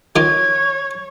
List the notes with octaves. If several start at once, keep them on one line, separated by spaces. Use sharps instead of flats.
D#3 A#3 F4 C#5 G#6